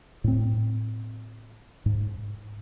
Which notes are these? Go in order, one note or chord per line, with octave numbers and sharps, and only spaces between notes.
A2 C4
G#2